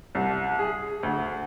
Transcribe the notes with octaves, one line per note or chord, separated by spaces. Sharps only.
C2
G#4
D2